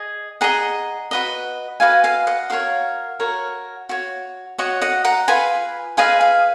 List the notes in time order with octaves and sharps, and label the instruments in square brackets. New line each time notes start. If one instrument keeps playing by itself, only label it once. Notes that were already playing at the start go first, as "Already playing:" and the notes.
Already playing: [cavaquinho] G#4 D#5
G#4 D#5 F#5 A#5
F#4 B4 D#5
F#4 B4 D#5 F5 G#5
F5 G#5
D#5 F#5
F#4 A#4 C#5 F5
F#4 A#4 C#5
F#4 C#5
F#4 C#5 D#5 F#5
D#5 F#5
F#5 A#5
F4 G#4 B4 G#5 B5
F4 G#4 B4 D#5 F5 G#5
F5